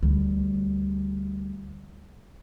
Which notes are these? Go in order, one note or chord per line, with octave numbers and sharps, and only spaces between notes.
D2 G3